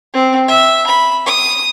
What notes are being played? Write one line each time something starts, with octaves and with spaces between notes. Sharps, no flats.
C4
E5
B5
D#6